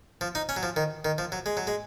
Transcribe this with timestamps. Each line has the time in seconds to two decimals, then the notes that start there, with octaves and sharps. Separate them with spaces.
0.21 F3
0.35 D#4
0.49 C#4
0.56 F#3
0.63 F3
0.76 D#3
1.05 D#3
1.18 F3
1.32 F#3
1.46 G#3
1.57 F#3
1.67 G#3